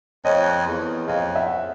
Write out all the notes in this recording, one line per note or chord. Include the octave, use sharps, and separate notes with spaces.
F2 C#5 D#5
E2
F2 D#5 F5
E5 F#5